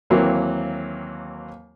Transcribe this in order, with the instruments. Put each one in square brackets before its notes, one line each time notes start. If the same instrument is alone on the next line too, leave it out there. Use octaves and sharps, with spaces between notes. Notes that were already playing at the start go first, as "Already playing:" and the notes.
[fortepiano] D#2 E3 F#3 A#3 C4